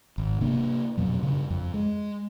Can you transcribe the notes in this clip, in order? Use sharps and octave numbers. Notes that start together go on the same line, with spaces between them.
G#1
C3 A#3 D4
F2 B2 F#3
G2 C#3
F2
G#3